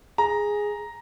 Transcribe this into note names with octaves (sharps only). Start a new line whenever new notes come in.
G#4 A#5